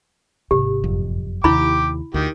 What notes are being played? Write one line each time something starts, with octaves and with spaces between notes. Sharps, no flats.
G#1 C3 G4
F#1 F2
D#2 C3 E4 G5 B5 D6
D2 D#3 F4 G4